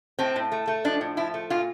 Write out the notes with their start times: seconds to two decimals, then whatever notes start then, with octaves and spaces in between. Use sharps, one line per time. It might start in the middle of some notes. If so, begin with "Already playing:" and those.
0.19 A2 C4
0.36 A2
0.52 A3
0.67 A3
0.84 F3 D4
1.01 A2
1.17 F3 E4
1.34 A3
1.50 A#2 F4